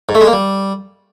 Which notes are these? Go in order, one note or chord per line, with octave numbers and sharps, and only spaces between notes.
G#2
A3
G#3
A#3
G3